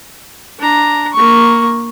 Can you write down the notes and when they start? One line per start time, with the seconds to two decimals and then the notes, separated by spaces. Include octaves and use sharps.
0.59 D4 A#5
1.14 A#3 C#6